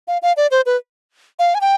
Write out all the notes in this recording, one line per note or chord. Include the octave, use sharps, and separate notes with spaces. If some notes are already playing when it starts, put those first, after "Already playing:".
F5
F5
D5
C5
B4
F5
G#5
G5